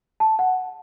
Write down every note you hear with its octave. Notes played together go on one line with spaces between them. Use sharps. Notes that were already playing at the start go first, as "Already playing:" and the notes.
A5
F#5